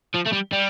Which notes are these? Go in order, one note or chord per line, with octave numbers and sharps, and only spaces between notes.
F3
A3
G3
G3